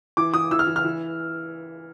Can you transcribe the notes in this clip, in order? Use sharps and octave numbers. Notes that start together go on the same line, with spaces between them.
E3 D6
E3 D#6
E3 E6
F6
E3
F6
E3